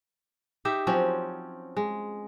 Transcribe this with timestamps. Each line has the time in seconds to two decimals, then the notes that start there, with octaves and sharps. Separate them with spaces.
0.65 D#4 G4 E5
0.87 F3 F#3 C4 C#4
1.77 G#3